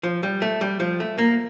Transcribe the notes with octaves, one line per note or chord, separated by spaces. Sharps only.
F3
G3
A3
G3
F3
A3
A#3